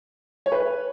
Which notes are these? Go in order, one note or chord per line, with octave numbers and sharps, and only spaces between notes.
C#5
B4